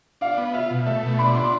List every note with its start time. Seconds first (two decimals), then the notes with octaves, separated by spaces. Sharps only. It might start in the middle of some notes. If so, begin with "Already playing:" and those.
0.21 D4 F5
0.38 B3
0.54 F4 E5
0.71 B2
0.86 A3 E5
1.03 B2
1.19 D4 B5
1.35 C6